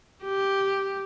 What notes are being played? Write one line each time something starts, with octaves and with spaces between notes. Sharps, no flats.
G4